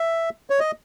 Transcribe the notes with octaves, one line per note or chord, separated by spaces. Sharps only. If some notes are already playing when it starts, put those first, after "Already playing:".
Already playing: E5
C#5
D#5